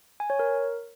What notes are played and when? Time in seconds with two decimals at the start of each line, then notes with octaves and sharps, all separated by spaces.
0.20 G#5
0.30 C#5
0.39 A#4